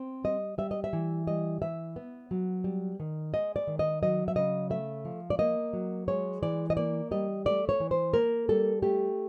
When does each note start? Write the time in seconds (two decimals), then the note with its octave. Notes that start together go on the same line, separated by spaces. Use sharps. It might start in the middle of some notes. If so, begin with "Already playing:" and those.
Already playing: C4
0.24 G3 D#5
0.58 G3 E5
0.71 D#5
0.84 E5
0.93 E3
1.27 G3 D#5
1.62 E3 E5
1.96 B3
2.31 F#3
2.64 G3
3.00 D#3
3.33 G#3 D#5
3.56 D5
3.67 D#3
3.79 D#5
4.02 F#3 D#5
4.28 E5
4.36 C#3 D#5
4.70 A3 E5
5.05 F3
5.30 D5
5.39 A#3 D#5
5.73 F#3
6.08 G#3 C#5
6.43 E3 D5
6.70 D#5
6.77 A#3 D5
7.11 G3 D#5
7.46 A3 D5
7.69 C#5
7.80 E3
7.91 C5
8.13 A#3 A#4
8.49 G3 A4
8.82 A3 G4